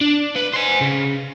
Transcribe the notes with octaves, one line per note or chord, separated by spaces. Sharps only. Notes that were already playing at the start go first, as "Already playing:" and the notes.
D4
B4
C5 G#5
C#3